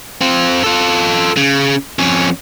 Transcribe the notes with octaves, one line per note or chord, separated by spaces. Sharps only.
C4 F4
F4 A4
C#3
F2 C#4